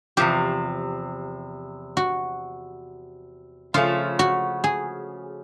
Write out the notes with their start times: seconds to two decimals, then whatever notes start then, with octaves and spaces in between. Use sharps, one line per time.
0.17 E2 C3 F3 G4
1.97 F#4
3.74 C#3 F3 A3 C#4 F4
4.19 F#4
4.64 G#4